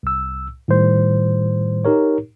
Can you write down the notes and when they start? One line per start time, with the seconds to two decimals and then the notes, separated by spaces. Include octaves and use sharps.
0.03 C2 E6
0.68 A2 D#3 G3 C5
1.85 D#4 G4 A#4 C#5